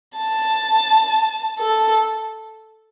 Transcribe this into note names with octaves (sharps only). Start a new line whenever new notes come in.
A5
A4